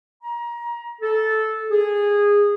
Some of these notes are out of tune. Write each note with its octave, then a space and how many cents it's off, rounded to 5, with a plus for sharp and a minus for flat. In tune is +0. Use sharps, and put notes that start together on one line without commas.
A#5 +25
A4 -10
G#4 -15